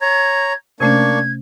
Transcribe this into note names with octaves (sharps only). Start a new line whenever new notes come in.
C#5 A#5 G#6
C3 A3 A#3 C#4 D4 C#6 G#6